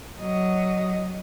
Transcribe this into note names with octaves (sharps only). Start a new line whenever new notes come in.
F#3 D#5